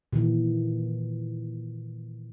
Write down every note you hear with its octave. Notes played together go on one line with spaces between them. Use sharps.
A#2 D#3 E3